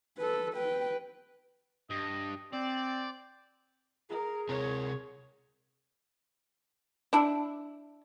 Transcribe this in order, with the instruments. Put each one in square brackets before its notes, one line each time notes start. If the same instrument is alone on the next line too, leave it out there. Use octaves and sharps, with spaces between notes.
[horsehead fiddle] A4 B4
B4 G5
[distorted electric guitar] G2 [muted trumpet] D#5
[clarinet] C4 [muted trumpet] C5 [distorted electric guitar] D5
[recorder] G#4 [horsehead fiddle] A#4
[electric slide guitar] C3 C4 A#4 [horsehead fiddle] C#5
[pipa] D4 E4